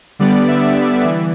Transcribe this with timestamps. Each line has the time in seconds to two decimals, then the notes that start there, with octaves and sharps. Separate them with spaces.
0.19 D3 G3 B3 D5
0.48 E5
1.04 E3